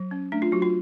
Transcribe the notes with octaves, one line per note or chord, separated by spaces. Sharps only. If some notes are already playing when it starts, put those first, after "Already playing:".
Already playing: F#3
C#4
A3 D4
F4
F#3 F#4
F4